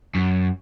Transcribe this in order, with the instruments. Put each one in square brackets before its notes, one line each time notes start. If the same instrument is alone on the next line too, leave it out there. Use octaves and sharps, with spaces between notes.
[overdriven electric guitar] F#2